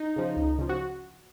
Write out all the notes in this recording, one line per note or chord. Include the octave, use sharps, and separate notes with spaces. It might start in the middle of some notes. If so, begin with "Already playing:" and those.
Already playing: D#4
C#3 F3
C#2
C#3 F3
F#4